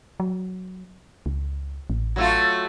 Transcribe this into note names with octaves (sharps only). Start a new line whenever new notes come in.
F#3
C#2
A1
F#3 A3 F4